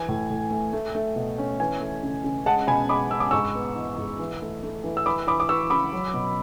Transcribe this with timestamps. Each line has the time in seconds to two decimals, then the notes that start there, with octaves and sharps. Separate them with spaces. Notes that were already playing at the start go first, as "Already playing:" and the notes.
Already playing: E3 G#5
0.08 A2
0.30 A2
0.51 A3
0.73 A3
0.95 A3
1.16 B2
1.38 C#4
1.60 E3 G#5
1.81 A3
2.03 C#3
2.24 C#3
2.46 G#3 F#5 A5
2.67 B2 G#5 B5
2.89 G#3 B5 D6
3.11 G#3 E6
3.20 D6
3.31 G#2 C#6 E6
3.55 B3
3.76 E3
3.98 G#2
4.19 E3
4.41 A3
4.63 A3
4.84 E3
4.97 E6
5.06 E3 B5 D6
5.27 E3 B5 D6
5.40 D6
5.49 E3 C#6 E6
5.70 C#3 B5 D6
5.93 F#3
6.14 B2